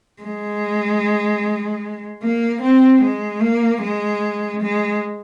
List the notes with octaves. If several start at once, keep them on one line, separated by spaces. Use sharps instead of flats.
G#3
A#3
C4
G#3
A#3
G#3
G#3